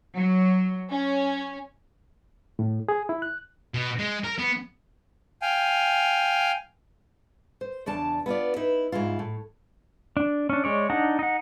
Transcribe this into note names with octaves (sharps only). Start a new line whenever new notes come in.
F#3
C#4
A2
G#4
E4
F#6
B2
G#3
A#4
B3
F5 G5 G#5
C5
E2 C#3 D4 A5
B3 E4 F4 D5
D#4 E4 B4
G#2 C#3 E4 F4
A2
D4
C#4 D4
G#3 C#5 D5
D4 D#4 F#5 A#5
D#4 F#5